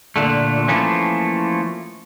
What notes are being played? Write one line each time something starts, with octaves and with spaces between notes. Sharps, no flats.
A#2 D3 A3
E3 F3 A3 A#3 C#4